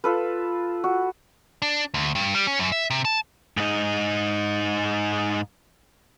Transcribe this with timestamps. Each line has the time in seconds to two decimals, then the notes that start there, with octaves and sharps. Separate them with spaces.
0.04 F4 A4 B4
0.84 F#4
1.62 D4
1.94 D2
2.15 G2
2.34 G3
2.47 C#4
2.60 F#2
2.72 E5
2.90 C3
3.05 A5
3.57 G#2 D#4